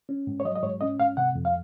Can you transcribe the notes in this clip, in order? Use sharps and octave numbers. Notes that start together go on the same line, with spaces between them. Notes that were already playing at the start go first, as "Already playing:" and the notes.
C#4
G#2
C#5
F#3 D#5
D#5
G#2 C#5
C#4 D#5
G#2 F5
C3 F#5
F2
F5